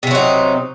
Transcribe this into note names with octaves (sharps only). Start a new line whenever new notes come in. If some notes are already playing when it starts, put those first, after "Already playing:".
C3 F#3 C4 D#4